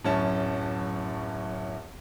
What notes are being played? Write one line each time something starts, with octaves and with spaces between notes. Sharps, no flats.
D1 F#2 C#4 A5